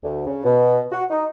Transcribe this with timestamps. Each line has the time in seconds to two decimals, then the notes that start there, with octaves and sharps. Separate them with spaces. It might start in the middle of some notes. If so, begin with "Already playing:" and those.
0.03 D2
0.27 C#3
0.44 B2
0.92 F#4
1.10 D#4